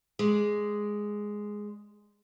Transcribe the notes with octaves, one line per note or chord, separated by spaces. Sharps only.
G#3 D5